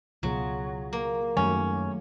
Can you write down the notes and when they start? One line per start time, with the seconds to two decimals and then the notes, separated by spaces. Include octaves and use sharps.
0.23 C#2 B2 F#3 F4 G#4
0.93 A#3
1.37 F#2 D#3 F#3 G3 A3 C#4